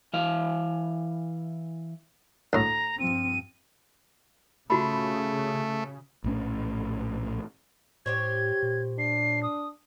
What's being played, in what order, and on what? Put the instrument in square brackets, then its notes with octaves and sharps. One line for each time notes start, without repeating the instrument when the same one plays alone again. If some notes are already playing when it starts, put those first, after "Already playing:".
[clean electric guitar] E3 E4 F5
[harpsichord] D2 A2 [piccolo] A#5
[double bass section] G2 F3 C4 [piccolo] D#7
[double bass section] C#3 [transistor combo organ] A3 [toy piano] F4 F#4 B5
[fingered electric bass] A#1 A2 C#4
[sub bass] A2 [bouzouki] G4 C5 C#5 [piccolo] G#6
[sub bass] A#2
[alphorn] D4 [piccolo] C7
[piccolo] D#6